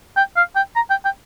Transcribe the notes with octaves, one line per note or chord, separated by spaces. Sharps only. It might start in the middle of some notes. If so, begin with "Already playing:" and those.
G5
F5
G5
A#5
G5
G5